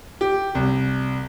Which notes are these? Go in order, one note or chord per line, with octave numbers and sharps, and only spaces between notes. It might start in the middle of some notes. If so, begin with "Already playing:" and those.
G4
C2